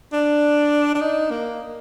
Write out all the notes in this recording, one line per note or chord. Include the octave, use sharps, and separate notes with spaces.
D4
D4
D#4
A#3